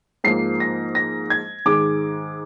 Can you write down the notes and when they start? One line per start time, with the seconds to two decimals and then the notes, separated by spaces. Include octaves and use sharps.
0.24 G#2 F3 A#3 C7
0.60 A#6
0.95 A#6
1.30 G#6
1.65 G#2 D#3 G#3 D6